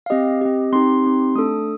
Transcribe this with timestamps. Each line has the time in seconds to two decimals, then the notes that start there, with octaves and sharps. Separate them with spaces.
0.06 F5
0.10 C4 G4 D#5
0.41 C4 G4
0.72 C4 D#4 G4 C6
1.04 C4 D#4 G4
1.35 A3 D4 A4 D#6